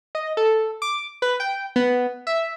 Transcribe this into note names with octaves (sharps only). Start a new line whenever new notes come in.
D#5
A4
D6
B4
G5
B3
E5